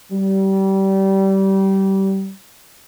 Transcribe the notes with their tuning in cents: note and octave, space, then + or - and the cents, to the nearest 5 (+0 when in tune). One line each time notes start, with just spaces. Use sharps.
G3 -25